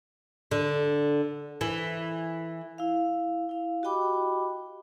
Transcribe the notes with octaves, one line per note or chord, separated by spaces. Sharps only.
D3
E3
E4 F5
E4 F5
F#4 G4 D#5 G5 B5 D6